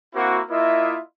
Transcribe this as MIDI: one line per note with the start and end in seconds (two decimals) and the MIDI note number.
0.15 0.40 58
0.15 0.40 60
0.15 0.40 64
0.15 0.40 66
0.50 0.98 58
0.50 0.98 64
0.50 0.98 65
0.50 0.98 75
0.50 0.98 76